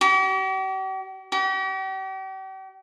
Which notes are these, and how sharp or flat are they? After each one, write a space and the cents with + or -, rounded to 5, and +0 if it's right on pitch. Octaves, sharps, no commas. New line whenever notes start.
G4 -45
G4 -40